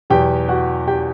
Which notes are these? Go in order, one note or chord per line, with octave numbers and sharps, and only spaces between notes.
E2 B2 F#3 G4 G5
F#4 F#5
G4 G5